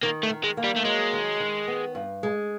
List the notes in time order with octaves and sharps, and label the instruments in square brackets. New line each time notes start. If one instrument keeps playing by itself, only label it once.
[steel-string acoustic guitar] D#3 [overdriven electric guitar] A#3
[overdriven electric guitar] A3
[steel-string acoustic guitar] D#3
[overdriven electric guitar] G#3
[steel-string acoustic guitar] A#3
[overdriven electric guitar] G3
A3
[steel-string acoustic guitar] F#3 [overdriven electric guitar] G#3
[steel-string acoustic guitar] D#3
D#3
B3
G2
G#3